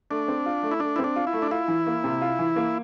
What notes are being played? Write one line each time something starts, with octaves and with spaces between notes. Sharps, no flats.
A3 D4
C4
F4
A3
E4
A3 D4
E4
C4
D4
F4
E4
A3
D4
E4 F4
E3
A#3
C3
F4
E3
A#3